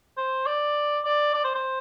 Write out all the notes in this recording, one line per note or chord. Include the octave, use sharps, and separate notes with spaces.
C5
D5
D5
D5
C5
C5